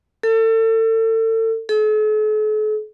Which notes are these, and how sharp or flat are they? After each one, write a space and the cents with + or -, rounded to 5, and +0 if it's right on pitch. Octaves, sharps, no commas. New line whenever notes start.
A4 +35
A4 -45